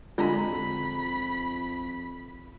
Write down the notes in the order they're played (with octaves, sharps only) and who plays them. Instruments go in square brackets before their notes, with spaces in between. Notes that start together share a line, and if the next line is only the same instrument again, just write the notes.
[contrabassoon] F2 [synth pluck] D3 G#3 [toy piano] F4 A#5 [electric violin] B5